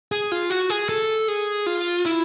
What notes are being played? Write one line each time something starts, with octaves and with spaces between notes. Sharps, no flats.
G#4
F4
F#4
G#4
A4
G#4
F4
E4